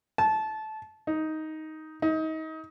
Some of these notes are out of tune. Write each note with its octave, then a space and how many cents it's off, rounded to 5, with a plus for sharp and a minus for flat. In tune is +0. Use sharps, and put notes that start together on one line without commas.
A5 -20
D#4 +10
D#4 +30